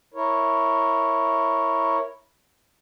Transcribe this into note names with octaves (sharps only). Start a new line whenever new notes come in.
E4 A#4 C#5